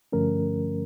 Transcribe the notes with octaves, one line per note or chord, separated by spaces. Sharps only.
G2 D3 F3 A3 C#4 A#4